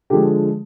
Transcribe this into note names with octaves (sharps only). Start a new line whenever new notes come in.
D3 F3 G#3 G4